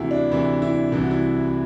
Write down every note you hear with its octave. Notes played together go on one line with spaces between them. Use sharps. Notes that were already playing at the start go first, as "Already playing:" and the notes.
Already playing: D2 C3 E3 E4 F#4
D4
D2 C3 E3 E4
E4
C2 C3 E3 E4
F#4
E4